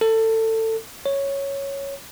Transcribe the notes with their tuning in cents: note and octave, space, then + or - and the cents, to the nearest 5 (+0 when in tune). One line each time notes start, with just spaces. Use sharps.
A4 +25
C#5 +0